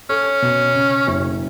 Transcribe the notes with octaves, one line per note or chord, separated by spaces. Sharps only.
C#4 A4
B2
C#3
F#1